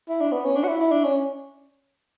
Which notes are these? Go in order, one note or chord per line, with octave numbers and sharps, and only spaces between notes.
E4
D4
B3
C#4
D4
F#4
E4
E4
D4
C#4